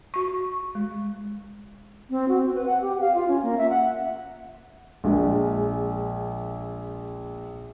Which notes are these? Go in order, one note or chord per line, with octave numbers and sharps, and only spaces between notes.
F#4 C#6
G#3
C4
F#4
C4
B4
F#5
G4
F5
F4
C#4
A#3
E5
F#5
A#1 G#3